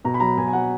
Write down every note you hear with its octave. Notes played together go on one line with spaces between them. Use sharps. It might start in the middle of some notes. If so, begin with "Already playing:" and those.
B2 A#5
B5
F#3 A#5
B2 G#5
G#5
F#3 F#5